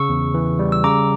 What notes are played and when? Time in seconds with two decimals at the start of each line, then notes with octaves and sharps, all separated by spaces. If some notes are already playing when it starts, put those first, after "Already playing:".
Already playing: C#3 C#6 E6
0.09 E2
0.34 E3
0.59 G3
0.72 E6
0.84 C#3 A#5 D6